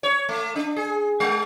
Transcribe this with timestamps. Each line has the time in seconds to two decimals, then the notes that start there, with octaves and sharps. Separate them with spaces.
0.03 C#5
0.29 A3
0.56 D4
0.76 G#4
1.20 G#3